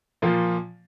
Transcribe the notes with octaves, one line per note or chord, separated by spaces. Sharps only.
A#2 F3 A#3 F4